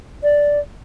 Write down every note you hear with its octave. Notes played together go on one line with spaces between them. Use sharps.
D5